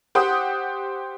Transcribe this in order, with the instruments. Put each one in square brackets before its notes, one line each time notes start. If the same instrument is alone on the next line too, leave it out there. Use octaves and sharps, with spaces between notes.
[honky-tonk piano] G4 C5 F#5 D#6